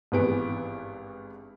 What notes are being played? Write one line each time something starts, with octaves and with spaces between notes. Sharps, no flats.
G#1 G2 E3 B3 G#4 D7